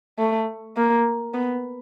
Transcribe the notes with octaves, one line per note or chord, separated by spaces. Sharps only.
A3
A#3
B3